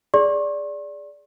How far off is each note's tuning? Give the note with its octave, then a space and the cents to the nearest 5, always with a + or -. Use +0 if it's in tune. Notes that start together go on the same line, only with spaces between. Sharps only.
G#4 +0 D5 -10 C#6 -45